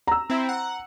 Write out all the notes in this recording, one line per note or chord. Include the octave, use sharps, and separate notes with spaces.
A#5 E6
C4 E4
F#5